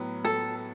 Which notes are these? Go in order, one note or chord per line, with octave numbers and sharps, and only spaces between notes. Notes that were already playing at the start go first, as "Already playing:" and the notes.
Already playing: A2 F#3 B3
A4